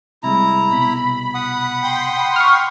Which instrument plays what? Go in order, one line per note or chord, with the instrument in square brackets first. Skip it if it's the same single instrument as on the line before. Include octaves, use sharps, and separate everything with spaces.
[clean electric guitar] C3 G3 G#3 [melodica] E4 A#5
[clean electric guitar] C2 B2 [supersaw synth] B5
[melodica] F#5 D#6
[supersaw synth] G5 B5 C6
[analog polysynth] C#6 F6